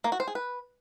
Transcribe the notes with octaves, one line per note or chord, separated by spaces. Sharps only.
A#3
F#4
C5
G#4
B4